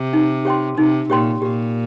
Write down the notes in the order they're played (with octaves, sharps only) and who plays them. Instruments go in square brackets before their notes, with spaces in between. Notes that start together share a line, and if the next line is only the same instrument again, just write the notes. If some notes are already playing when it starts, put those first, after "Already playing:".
Already playing: [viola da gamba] C3
[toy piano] D#4
G4 C#5 G5 C6
[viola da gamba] C3 [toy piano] D#4
[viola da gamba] A#2 [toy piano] G4 C#5 G5 C6
[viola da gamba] A#2 [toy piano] G4